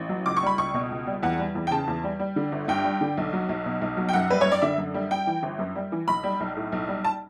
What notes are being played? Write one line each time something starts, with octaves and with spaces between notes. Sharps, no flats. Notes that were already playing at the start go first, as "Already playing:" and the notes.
Already playing: A1
F#3
C#2 D6
C#6
G3 B5
C#2 C#6
B2
C#2
G3
E2 F#5
G3
E2
G5
C#3 A5
E2
G3
G3
D3
G1
G2 G5
G3
D3
B1
F#3
B1
B2
B1
F#3
G5
F#2 F#5
G3 B4
F#2 C#5
D5
D3 E5
F#2
G3
G3 G5
E3
G1
F#2
G3
E3
B1 B5
G3
B1
A2
B1
G3
A5